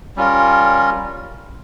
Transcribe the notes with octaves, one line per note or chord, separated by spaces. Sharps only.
G3 C#4 F4 A#4